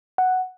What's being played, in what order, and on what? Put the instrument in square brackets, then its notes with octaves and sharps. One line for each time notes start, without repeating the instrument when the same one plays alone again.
[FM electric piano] F#5